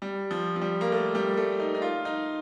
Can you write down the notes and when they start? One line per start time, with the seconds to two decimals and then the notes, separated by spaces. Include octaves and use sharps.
0.02 G3
0.31 F3
0.56 F3
0.61 G3
0.81 A#3
0.92 A3
1.15 G3
1.37 A3
1.60 D#4
1.75 D#4
1.82 F4
2.05 D#4